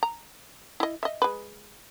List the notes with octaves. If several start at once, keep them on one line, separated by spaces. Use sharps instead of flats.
A#5
E4 D#5
D#5 E5
G#3 B4